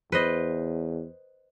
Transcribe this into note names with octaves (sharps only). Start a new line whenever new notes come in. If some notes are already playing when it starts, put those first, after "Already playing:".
E2 B4 C5 D#5